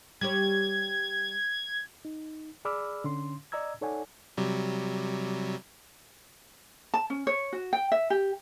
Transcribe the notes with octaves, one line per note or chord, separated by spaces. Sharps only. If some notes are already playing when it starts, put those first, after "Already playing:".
G3 G4 C#5 G#6
D#4
G#4 D5 B5 D6 E6 F6
D3 C#4 C6
D5 D#5 A#5 E6 G#6
D#4 A4 C#5 D5 F#5 G#5
C3 F#3 G3
A5
C#4
C#5
F#4
G5
E5
G4